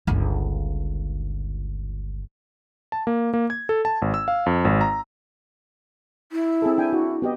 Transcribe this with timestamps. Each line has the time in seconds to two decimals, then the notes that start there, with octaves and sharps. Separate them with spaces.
0.07 G1 C#2
2.92 A5
3.07 A#3
3.34 A#3
3.50 G#6
3.69 A4
3.85 A5
4.02 G#1
4.14 E6
4.28 F5
4.46 F2
4.65 G#1
4.81 A#5
6.32 E4
6.62 C4 G#4 A4
6.78 D4 G5 G#5
6.93 F#4
7.22 B3 G4 D#5